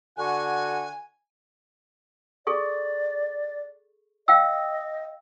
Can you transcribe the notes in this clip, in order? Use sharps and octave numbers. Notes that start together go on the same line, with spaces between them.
D3 F#4 F#5 G#5
G#4 A4 D5 C#6
D#5 F5 G5 E6